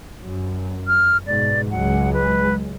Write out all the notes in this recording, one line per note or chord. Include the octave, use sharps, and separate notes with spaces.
F#2
F6
G#2 B2 D5
C#2 F#3 G#3 F#5
B4